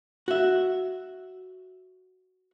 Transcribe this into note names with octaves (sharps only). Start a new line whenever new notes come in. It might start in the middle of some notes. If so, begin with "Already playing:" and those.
F#4 E5